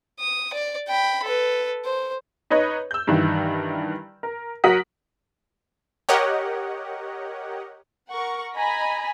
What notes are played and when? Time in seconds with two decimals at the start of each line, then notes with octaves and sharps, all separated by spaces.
0.20 D#6
0.53 D5
0.88 G5 B5
1.24 A4 B4
1.85 C5
2.50 D#4 B4 C#5 D#5
2.91 E6 G6
3.07 G2 D#3 E3
4.23 A#4
4.64 F#3 F#4 A#4 F#5 D#6 B6
6.09 G4 A#4 C#5 D#5 F#5
8.10 A#4 F#5 C#6
8.54 D#5 G#5 A#5 B5